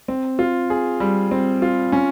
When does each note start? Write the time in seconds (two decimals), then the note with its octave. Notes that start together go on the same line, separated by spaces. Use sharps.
0.08 C4
0.39 F4
0.70 G#4
1.00 G3
1.31 C4
1.62 F4
1.92 C#4